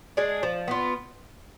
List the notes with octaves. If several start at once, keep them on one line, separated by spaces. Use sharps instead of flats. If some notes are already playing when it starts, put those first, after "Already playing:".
G#3 D4 G#4
F3
B3 F4